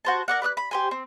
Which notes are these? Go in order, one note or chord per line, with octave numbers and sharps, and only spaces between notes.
F#4 C5 A5
A#4 D5 F#5
B4 D5 D#6 F#6
B5
G4 C5 G#5
C4